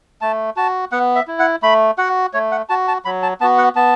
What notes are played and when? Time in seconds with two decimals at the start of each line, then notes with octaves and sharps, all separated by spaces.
0.21 A3 A5
0.57 F#4 A5
0.92 B3 F#5
1.15 E5
1.27 E4
1.39 F#5
1.63 A3 B5
1.98 F#4 F#5
2.34 A3 C#5
2.52 F#5
2.69 F#4 A5
2.88 A5
3.05 F#3 B5
3.23 A5
3.41 B3 A5
3.44 F#4
3.58 F#5
3.75 B3 A5